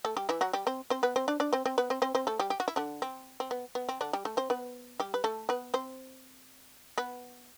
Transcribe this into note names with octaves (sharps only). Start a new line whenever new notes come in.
A3 A4
G3 G4
E3 E4
F#3 F#4
G3 G4
C4 C5
C4 C5
B3 B4
C4 C5
D4 D5
D4 D5
C4 C5
C4 C5
B3 B4
C4 C5
C4 C5
C4 C5
A3 A4
G3 G4
G4
F#4
E4
D3 D4
C4
C4
B3
B3
C4
D3 D4
G3 G4
A3 A4
C4 C5
B3 B4
G3 G4
B4
A3 A4
B3 B4
C4 C5
B3 B4